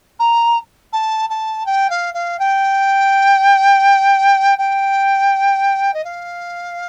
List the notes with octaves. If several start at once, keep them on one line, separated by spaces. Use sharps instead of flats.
A#5
A5
A5
G5
F5
F5
G5
G5
D#5
F5